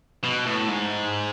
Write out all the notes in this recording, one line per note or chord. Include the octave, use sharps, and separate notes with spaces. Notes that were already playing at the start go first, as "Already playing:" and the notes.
B2
A2
G#2